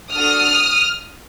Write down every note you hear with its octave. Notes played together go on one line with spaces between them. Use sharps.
D4 F#4 A4 D#6 F6